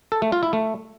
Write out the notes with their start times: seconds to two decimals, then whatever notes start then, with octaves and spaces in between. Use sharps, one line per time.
0.12 A4
0.22 A3
0.32 F4
0.43 E4
0.53 A3